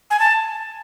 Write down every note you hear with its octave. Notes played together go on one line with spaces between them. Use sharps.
G#5
A5